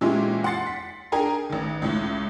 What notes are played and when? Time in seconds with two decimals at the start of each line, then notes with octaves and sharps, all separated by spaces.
0.01 A#2 E3 G#3 C#4 E4 G4
0.44 F#5 C6 A6 C7 C#7
0.67 B6
1.12 D4 G#4 A#4 G5 G#5 A#5
1.50 A1 D#3
1.82 C#2 A2